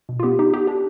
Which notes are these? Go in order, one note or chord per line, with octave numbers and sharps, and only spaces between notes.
B2
F4
B3 G4
D#4 G4
B3 G4
D4 G4